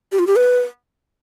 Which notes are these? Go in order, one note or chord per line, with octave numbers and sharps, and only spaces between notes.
G4
F4
G4
B4